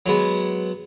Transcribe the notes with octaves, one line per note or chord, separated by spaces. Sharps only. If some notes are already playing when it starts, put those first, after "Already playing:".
F#3 G#3 B3